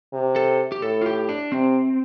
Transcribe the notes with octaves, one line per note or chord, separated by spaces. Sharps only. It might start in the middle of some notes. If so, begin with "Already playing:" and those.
C3
A4
G4
A2 A4
F4
G4
D4
C3 C4